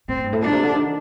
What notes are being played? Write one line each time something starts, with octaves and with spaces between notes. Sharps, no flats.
A2 C4
G2
A2
A#2 D4
C3
D3
D#3